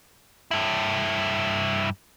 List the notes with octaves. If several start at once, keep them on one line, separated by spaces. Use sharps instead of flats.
G2 E4